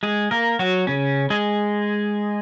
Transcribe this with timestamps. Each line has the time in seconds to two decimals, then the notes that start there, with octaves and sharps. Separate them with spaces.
0.03 G#3 G#4
0.31 A#3 A#4
0.59 F#3 F#4
0.87 C#3 C#4
1.30 G#3 G#4